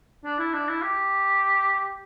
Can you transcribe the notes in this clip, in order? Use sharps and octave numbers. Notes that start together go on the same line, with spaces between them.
D4
E4
D4
E4
G4